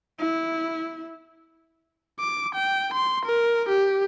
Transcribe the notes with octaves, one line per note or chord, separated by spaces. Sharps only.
E4
D6
G5
C6
A#4
G4